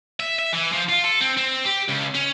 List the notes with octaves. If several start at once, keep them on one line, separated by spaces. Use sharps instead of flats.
E5
E5
E3
F3
F4
A4
C4
C4
G4
C#2
C#4